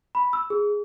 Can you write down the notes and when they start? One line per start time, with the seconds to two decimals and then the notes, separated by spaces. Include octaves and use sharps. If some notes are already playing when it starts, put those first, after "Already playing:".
0.15 B5
0.33 E6
0.50 G#4